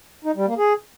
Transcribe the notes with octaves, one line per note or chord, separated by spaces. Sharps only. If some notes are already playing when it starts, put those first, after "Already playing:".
D#4
G3
A#3
G#4